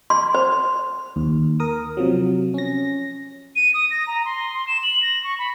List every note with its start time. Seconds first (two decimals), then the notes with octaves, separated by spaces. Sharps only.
0.10 C6
0.35 C5
1.16 D#2
1.60 A#4 D#6
1.97 C3 F3 F#3
2.54 C#4 A#6
3.56 D#7
3.74 D#6
3.91 A#6
4.07 A#5
4.25 C6
4.54 C6
4.68 E7
4.83 F#7
5.03 A#6
5.24 C#6
5.39 B5